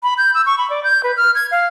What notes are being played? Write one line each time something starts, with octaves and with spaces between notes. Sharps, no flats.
B5
G6
E6
C#6
B5
D5
G6
B4
F6
G#6
F5